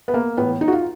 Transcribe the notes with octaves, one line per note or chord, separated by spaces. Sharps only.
B3
A#3
A2 E3 B3
D#4
F#4
F4